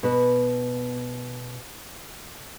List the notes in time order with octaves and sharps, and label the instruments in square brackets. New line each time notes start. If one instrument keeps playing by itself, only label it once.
[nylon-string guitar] B2 B4